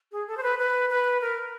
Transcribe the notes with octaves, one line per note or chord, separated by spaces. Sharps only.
G#4
A4
C5
B4
B4
B4
A#4